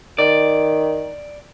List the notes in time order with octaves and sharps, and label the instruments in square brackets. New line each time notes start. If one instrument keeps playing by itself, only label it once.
[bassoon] D#3 [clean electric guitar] D5